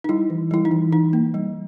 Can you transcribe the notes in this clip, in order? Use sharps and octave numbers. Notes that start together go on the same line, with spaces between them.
D#4
G3 E4
E3
G3 E4
D#4
E3
E3 D#4
A#3
G3